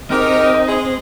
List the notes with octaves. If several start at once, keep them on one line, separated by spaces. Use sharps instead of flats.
C4 D#4 G4 G#4 A#4 D#5
G#3 G#4